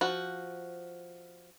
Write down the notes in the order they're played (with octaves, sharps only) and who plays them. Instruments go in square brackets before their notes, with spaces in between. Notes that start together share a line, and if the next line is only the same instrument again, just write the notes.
[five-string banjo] F3 F#4